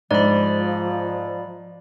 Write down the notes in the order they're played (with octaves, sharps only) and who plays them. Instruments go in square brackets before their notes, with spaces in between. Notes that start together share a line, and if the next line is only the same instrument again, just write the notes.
[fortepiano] G#2 [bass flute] F3 [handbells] D5 B5